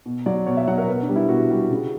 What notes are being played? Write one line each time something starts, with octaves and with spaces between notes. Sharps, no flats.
B2
F#3 D5
B2 C#5
E5
F#3 F#5
A#4
B2 B4
D4
G3
E4
B2 F#4
G3
C#3